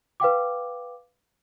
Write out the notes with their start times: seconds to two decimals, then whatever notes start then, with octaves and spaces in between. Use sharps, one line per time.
0.20 B4 F5 G5 D6